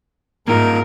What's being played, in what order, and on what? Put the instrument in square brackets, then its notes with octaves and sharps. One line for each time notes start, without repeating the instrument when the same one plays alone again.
[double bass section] G#2 [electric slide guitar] A#3 D#4 F4 [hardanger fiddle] A#4